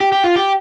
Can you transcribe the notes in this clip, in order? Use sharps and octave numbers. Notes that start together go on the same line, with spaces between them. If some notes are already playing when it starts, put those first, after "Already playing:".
G4
G4
F4
G4